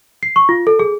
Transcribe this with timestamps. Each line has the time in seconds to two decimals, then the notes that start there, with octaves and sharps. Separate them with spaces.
0.23 C7
0.36 C#6
0.49 F4
0.67 A4
0.79 G#4